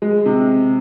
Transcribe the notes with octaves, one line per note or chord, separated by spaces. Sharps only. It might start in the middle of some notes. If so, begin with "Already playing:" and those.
G#3
C3